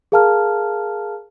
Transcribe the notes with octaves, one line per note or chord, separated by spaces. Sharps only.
G#4 A#4 F5 A5 A#5 F6